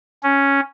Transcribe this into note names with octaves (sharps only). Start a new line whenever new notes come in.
C#4